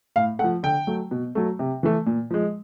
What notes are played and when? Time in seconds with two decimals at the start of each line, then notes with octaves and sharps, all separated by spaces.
0.16 A2 F5
0.39 A3 F#5
0.44 F3
0.63 D3 G5
0.87 F#3 A3
1.11 B2
1.35 F#3 A3
1.59 C3
1.83 E3 A3
2.06 A#2
2.31 F3 G#3